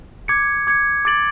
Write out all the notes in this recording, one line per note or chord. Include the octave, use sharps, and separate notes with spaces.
D6 G#6 C#7
D6 G#6 C#7
D6 A6 D7 F#7